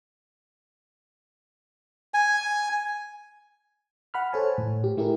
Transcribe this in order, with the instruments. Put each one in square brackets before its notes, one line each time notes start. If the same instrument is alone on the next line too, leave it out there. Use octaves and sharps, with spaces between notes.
[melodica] G#5
[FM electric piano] F#5 B5 F6
A4 C5 C#5 G#5 A5
A2
G4
A3 E4 G4 G#4 A#4